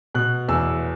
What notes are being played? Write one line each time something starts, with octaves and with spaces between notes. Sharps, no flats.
B2 F#6
E2 E6